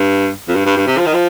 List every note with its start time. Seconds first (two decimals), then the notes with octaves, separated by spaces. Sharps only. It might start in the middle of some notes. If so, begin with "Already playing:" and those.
Already playing: G2
0.48 F2
0.56 G2
0.66 G2
0.77 G2
0.87 C3
0.98 F3
1.06 D#3
1.13 F3